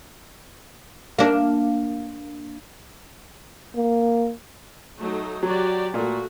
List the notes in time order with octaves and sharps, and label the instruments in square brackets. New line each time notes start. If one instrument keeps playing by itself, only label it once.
[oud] A#3 D4
[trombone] A#3
[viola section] F#3 A3 D#4
[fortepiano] F#3 [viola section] F#4 G4 D5
[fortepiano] A#2 [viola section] A3 F#4